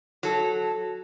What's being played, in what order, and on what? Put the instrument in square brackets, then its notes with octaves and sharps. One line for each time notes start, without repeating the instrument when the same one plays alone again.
[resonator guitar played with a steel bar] F#3 A4